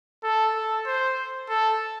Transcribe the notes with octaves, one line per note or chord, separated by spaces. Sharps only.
A4
A4
C5
A4